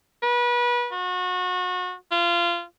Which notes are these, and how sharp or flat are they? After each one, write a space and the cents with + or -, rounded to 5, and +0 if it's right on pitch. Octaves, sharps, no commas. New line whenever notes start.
B4 -30
F#4 -30
F4 -25